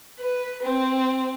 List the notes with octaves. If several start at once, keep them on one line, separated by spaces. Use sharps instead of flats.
B4
C4